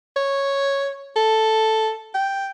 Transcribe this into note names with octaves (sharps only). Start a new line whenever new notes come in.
C#5
A4
G5